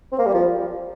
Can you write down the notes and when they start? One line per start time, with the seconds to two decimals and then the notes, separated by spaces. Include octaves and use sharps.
0.12 C4
0.19 A#3
0.26 G3
0.34 F3